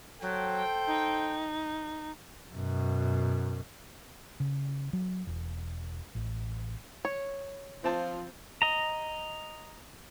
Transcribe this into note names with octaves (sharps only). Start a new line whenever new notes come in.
F#3 A4 C5 G5
D#4
F#2 B2
C#3
F#3
E1
A1
C#5
F3 C4 F4 A5
D#5 A#5